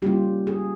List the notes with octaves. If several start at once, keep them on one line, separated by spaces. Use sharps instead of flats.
G3 A#3 C#4 F4 G4
G#4